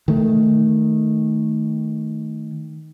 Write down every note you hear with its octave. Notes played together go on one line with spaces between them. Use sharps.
D#3 A3